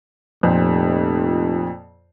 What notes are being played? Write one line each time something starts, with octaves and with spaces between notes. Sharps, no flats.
F1 F2 A#2 C5